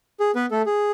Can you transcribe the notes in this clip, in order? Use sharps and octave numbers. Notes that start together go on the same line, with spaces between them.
G#4
B3 B4
A3 A4
G#4